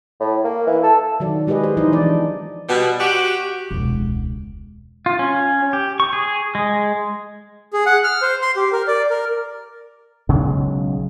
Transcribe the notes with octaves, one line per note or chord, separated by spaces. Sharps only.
A2
A#3
E3
A4
D#3 F#3 F#4 D5
G#3 G4 G#4 B4 D#5
C5
F3 D#4 E4 D#5
E3 B3 D4 D5
B2 G3
F#4 G4
E1 C#2
F4
C#4
G4
C#6
G#4
G#3
G#4
F#5
F6
C5
C6
G4
A#4
D5
A#4
B1 C#3 F#3 G#3